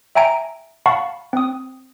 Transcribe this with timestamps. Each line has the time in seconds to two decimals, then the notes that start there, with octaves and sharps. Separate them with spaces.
0.15 E5 G5 G#5 A#5 D7
0.86 F5 F#5 A5 B5 C#6
1.33 C4 D#6